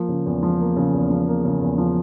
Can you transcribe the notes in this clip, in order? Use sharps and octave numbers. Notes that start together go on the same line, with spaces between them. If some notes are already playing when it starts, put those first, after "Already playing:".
Already playing: F3 A#3
C#3
E2
F3
A#3
C#3
E2
F3
A#3
C#3
E2
F3